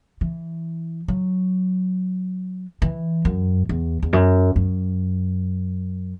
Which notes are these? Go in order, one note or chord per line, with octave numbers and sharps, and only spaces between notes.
E3
F#3
E3
F#2
E2
E2
F#2
F#2